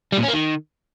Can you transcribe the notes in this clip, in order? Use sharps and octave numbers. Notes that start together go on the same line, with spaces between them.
G3
A#2
C#4
A#3
D#3